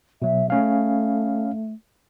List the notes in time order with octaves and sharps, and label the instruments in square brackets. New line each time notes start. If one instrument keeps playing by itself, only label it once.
[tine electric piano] B2 F#3 [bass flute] E5
[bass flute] A3 [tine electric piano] C#4 F5